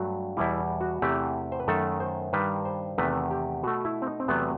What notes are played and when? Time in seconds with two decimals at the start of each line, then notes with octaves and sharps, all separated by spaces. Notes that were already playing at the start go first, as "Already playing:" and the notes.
Already playing: G2 F#3 A3 F#4
0.37 E2 B2 G3 E4
0.81 F#4
1.02 E2 C3 E3 A3 G4
1.52 C5
1.60 B4
1.68 F#2 D#3 A3 A4
2.00 C5
2.33 G2 D#3 G3 B4
2.65 C5
2.98 E2 C3 D#3 A3 B4
3.31 G4
3.63 B2 A3 F#4
3.85 E4
4.02 C4
4.07 D#4
4.20 C4
4.28 E2 C3 F#3 A3 B3